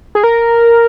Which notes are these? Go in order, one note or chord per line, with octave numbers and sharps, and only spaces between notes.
G#4
A#4